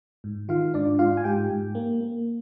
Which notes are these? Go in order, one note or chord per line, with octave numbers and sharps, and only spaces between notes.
G#2
D#3 F4 F5
G#2 D4 D5
G#2 F4 F5
G#5
G#2 G4 G5
G#2
A#3
A#3